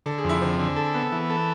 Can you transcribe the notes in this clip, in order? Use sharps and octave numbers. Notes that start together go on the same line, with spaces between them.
D3 A4
G#4
F2
E4
D3 C4
D3
A4
B3
E3
A4